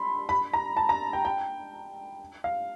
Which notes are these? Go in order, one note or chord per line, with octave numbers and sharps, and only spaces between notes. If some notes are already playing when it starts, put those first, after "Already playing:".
Already playing: B5 C6
B5
A#5
A5
A#5
G5
G5
F5